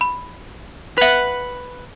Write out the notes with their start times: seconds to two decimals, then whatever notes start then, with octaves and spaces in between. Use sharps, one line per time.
0.01 B5
0.98 B4 E5 F#5 F7